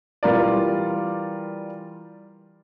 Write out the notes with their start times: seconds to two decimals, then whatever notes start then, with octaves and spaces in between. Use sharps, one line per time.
0.23 E3 G3 F4 A#4 D5